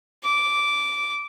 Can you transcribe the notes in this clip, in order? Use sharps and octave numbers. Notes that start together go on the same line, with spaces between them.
D6